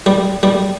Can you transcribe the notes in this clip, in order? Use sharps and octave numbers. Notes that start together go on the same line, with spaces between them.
G3
G3